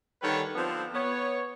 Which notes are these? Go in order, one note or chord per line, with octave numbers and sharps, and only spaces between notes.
D3 D#3 G3 A4 B4 C#5
D3 F3 B3 C4
B3 C#5